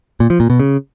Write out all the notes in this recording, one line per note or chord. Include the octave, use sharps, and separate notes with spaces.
A#2
F3
A#2
B2
C#3